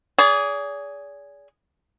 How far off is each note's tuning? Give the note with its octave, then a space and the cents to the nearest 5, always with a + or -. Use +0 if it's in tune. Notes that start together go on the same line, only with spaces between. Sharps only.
G#4 +0 D5 -40